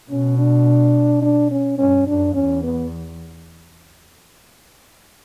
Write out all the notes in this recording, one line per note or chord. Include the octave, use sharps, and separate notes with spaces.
B2 C#4
D4
D4
C#4
G2 C#4
F#2 D4
E2 C#4
B3